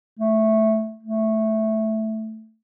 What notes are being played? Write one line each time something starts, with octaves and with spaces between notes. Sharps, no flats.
A3
A3